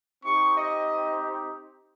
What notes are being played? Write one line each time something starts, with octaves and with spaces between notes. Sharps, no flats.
C4 D#4 G4 C#6
D#5